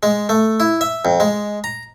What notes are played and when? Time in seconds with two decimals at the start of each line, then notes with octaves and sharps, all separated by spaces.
0.03 G#3
0.29 A3
0.60 E4
0.81 E5
1.05 F2
1.20 G#3
1.64 A#5